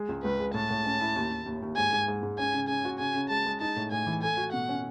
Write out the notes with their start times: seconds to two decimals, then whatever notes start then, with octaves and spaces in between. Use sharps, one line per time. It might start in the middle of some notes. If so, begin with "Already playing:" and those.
Already playing: G#3
0.09 C#2
0.24 C#2 B4
0.40 G#3
0.54 A2 A5
0.70 A2
0.85 C#4
1.01 E4
1.16 D#2
1.31 D#2
1.46 D#2
1.62 D#2
1.77 G#2 G#5
1.92 G#2
2.08 G#2
2.23 G#2
2.39 C#4 G#5
2.54 C#3
2.68 C#3 G#5
2.85 F#4
2.99 C#3 G#5
3.15 C#3
3.30 G#3 A5
3.46 G#3
3.61 D#4 A5
3.76 A2
3.92 A2 G#5
4.07 E3
4.23 A3 G#5
4.37 F#4
4.53 B2 F#5
4.69 C#4